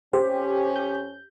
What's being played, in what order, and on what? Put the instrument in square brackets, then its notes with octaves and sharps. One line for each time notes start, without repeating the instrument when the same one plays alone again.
[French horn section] F2 C#4 [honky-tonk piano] G4 [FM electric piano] C5
[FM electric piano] G6